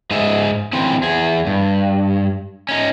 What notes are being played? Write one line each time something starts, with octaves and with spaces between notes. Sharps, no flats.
G#2 D#4 G#4 E5
D3 E3 C4 C#4
E2 G#4
G2
C#4 D#4